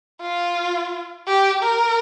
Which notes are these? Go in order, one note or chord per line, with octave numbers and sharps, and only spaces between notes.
F4
G4
A#4